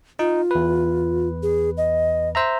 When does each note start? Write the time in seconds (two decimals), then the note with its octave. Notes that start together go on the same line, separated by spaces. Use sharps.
0.19 D#4 F4
0.51 E2 B4
1.43 G#4
1.77 D#5
2.35 C5 E5 A#5